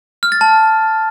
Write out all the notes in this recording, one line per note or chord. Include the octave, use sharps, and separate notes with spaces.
F6
A6
A5